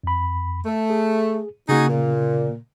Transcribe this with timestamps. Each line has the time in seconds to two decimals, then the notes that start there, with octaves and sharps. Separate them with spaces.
0.04 F2 B5
0.65 A3
0.90 G#4
1.69 C#3 A#3 D#4 F#4 G#4
1.89 A#2